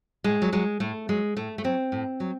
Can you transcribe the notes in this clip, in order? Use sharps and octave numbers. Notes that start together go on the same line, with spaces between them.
A2 G#3
F#3
F#3 G#3
A2 A3
F#3 G#3
A2 A3
A3
F#3 C4
A2
F#3